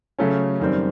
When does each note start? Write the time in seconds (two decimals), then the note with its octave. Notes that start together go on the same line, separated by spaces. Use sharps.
0.19 C#3 F#3 A3 C#4
0.60 F#2 D#3 G3 C4